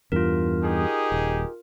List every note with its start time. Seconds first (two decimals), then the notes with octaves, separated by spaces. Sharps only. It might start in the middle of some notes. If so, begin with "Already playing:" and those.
0.12 E2 G2 F4 A#4
0.63 D#4 G4 G#4
1.12 D#1